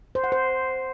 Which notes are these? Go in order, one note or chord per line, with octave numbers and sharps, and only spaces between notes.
C5
F#5
C5